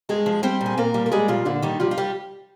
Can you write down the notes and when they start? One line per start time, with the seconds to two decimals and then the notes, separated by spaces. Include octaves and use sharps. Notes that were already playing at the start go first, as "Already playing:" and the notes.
0.09 G2 G#3 G#4
0.26 F3
0.43 G3 C4 C5
0.61 A#2
0.66 G#4
0.77 A#2 A#3 A#4
0.94 G3
1.06 A#4
1.12 G3 G#3 G#4
1.28 A#2 F3 F4
1.45 A#2 D3 D4
1.62 D#3 G3 D#4
1.80 F3 G3 F4
1.91 F4
1.98 G3 G4